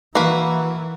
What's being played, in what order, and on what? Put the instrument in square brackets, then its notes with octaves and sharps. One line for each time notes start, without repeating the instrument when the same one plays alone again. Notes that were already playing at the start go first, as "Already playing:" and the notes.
[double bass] E3 [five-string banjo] A#3 F#4 B4